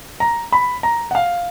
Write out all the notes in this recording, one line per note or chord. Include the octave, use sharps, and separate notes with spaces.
A#5
B5
A#5
F#5
F5